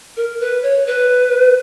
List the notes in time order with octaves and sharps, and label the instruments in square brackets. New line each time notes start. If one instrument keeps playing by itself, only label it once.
[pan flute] A#4
B4
C#5
B4